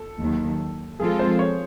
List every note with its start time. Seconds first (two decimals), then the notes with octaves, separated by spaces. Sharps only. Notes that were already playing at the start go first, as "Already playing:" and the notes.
Already playing: A4
0.20 D#2 D#3 F#3
1.00 F3 G#3 C4 F4 G#4 A4
1.19 C5
1.39 C#5